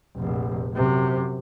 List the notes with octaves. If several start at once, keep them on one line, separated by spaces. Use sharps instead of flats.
F1 A#1
F#2 C3